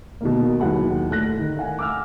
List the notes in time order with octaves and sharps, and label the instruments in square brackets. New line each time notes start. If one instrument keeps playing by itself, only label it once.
[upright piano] B2 D#3 A#3
D#2 F#3 E4 G#4 F#5 B5
A2 A4 F#6 A#6
D#3
F5 F#5 G#5
D6 E6 F6